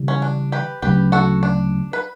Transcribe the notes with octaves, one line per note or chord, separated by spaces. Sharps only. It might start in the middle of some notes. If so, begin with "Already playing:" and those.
Already playing: C#3 E3 G3
C#4
D4
G4 B4
D2 C#3 F#3 C#4 G4 B4
F#4 A4
D4
B4